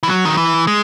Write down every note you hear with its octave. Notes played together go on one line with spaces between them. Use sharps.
E3
F#3
D#3
E3
G#3